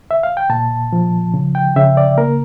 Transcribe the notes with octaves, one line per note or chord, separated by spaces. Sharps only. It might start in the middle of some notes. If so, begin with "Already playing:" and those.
E5
F5
G5
A#2 A5
F3
C#3
G5
C#3 E5
D5
A#3 A#4